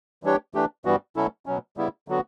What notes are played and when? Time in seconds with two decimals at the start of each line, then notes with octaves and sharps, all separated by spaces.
0.23 E3 G3 D4 G4 C#5
0.54 E3 A3 D4 G4
0.85 G2 E3 G3 B3 F#4
1.16 B2 F#3 C#4 E4 A4
1.46 B2 F#3 C#4
1.77 C#3 G3 B3 E4
2.08 D3 F#3 B3 F#4